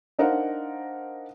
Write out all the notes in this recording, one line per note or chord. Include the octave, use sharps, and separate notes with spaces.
D4 D#4 A#4 C5 F5 F#5